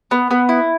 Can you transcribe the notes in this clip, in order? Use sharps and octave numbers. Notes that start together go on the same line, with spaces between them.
B3
B3
E4